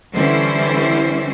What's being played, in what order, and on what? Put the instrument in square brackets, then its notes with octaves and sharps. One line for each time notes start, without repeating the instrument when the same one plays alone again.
[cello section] D3 E3 G3 C#4 E4 C5